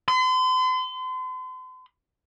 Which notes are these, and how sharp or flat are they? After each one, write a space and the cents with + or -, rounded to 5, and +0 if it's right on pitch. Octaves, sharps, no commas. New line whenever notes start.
C6 -40